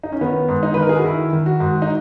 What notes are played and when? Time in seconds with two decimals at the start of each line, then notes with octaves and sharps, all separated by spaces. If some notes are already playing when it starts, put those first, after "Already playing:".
0.03 D#4
0.12 C#4
0.21 D#3 B3
0.49 G#2
0.63 D#4
0.74 B4
0.77 D#3
0.82 A#4
0.89 G#4
0.97 F#4
1.05 D#3 E4
1.33 D#3
1.46 F#4
1.60 G#2
1.82 D#4